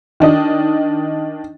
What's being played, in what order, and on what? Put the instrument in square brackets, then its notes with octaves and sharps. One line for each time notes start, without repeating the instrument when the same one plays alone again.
[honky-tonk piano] D#3 D4 D#5